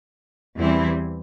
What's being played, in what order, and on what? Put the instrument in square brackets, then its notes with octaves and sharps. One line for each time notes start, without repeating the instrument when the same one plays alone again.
[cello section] E2 E3 G3 C4 E4